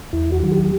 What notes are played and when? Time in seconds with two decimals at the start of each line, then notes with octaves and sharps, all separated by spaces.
0.13 E2 E4
0.32 F#4
0.42 D#3 F#3 F#4
0.52 G4